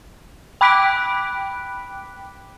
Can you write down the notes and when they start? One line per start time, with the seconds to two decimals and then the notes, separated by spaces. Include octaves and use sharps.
0.61 G5 B5 D6 F#6 B6 D7